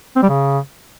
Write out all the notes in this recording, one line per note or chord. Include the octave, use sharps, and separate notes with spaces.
C4
G3
C#3